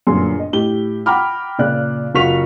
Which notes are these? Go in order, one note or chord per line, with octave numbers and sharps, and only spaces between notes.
G1 F#2 A#2 G#4 C6
D#5
A2 G4 G7
F#5 G5 A#5 B5 D6 F6
A#2 C#3 D5 F#6
F#1 F4 F#4 C#6 B6 F7